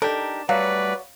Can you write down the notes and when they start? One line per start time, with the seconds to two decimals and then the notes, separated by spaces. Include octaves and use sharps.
0.02 D4 D#4 G4 A4 A#4
0.49 F#3 G3 A3 F#4 B4 D5 F5